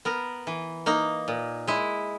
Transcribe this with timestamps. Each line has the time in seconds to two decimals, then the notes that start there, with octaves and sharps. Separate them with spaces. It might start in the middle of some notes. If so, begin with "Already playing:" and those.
0.05 B3 A#4
0.47 E3
0.86 A#3 D#4
1.28 A#2
1.68 G#3 E4